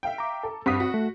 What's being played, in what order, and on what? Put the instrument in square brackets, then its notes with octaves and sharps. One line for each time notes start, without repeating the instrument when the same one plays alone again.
[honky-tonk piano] E5 F5 G5
[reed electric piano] A#5 D6
[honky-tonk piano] A4
[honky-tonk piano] G2 B6 [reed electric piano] C4 F#5 D#6
[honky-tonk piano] F#4
[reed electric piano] A3